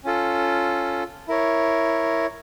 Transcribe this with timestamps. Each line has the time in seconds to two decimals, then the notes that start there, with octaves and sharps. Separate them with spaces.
0.04 C#4 F4 A4
1.28 E4 A#4 C#5